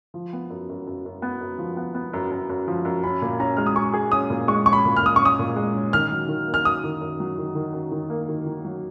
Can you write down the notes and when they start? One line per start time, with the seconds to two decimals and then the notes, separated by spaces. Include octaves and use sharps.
0.14 F3
0.33 B3
0.50 F#2
0.69 F#2
0.87 F#2
1.05 F#2
1.22 B3
1.40 F#2
1.58 F3
1.77 B3
1.95 B3
2.13 F#2
2.31 F#2
2.49 F#2
2.68 F3
2.85 F#2
3.04 C#4 B5
3.22 A#2
3.40 C#4 A#5
3.57 G#3 F6
3.66 D#6
3.76 G#4 C#6
3.93 G#4
4.12 C#4 D#6
4.30 A#2
4.48 G#3 C#6
4.66 C#4 C#6
4.73 B5
4.85 A#2
4.96 F6
5.02 A#2 D#6
5.16 C#4 C#6
5.25 D#6
5.39 A#2
5.56 G#3
5.74 C#4
5.93 D#3 F6
6.11 F#3
6.28 D#3
6.47 A#3
6.54 F6
6.65 F#2 D#6
6.84 D#3
7.01 F#2
7.20 F#3
7.38 D#3
7.55 D#3
7.73 F#2
7.92 D#3
8.10 A#3
8.28 D#3
8.46 D#3
8.65 F#3